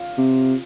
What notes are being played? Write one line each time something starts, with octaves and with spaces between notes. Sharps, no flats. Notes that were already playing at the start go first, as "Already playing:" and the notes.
Already playing: F4
C3